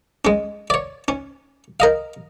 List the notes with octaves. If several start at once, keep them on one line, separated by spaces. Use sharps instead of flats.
G#3 C#4
C#5 D5
C#4
A#4 D#5 F5